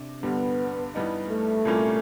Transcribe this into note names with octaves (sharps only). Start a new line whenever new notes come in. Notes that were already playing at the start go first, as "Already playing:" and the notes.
Already playing: C3 D4
G2 D3 G3 B3
G2 E3 G3 B3 D#4
A3
C2 A#2 G3 A#3 C#4